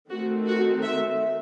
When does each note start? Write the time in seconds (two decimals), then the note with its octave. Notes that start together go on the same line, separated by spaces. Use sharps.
0.10 D#3 A3 C4 F#4
0.46 F#4
0.82 E5